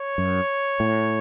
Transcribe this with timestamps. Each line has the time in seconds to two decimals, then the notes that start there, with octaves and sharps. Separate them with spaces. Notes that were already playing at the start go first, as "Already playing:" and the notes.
Already playing: C#5
0.18 F#2
0.80 A2